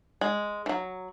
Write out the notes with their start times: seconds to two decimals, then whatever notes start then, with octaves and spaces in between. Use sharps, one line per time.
0.21 G#3
0.66 E3 F#3